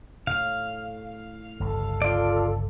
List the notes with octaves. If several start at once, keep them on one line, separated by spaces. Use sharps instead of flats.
A2 F5
G1 C#2 A4
F4 D5